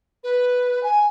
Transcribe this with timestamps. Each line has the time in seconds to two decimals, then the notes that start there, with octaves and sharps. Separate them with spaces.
0.24 B4
0.83 G#5